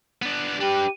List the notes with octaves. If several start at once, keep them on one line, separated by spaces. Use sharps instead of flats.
B3 D4
D4 G4 B4